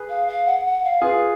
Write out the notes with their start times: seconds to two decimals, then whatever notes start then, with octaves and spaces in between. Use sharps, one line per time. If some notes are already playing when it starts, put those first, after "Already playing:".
Already playing: G#4 B4
0.09 F5
0.27 F5
0.46 F#5
0.65 F#5
0.83 F5
1.02 F4 G#4 B4